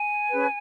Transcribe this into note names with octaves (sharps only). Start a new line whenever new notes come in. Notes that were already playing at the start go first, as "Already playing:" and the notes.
Already playing: G#5
C#4 G#4 B4